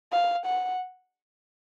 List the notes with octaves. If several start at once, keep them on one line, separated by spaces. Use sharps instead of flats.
F5
F#5